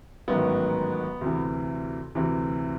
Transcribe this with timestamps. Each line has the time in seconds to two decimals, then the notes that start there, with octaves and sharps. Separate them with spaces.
0.28 A1 G#2 D#3 F#3 B3
1.21 D2 C3 E3
2.15 D2 C3 E3